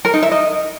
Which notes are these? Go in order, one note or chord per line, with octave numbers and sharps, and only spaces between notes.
A#4
D#4
E5
D#5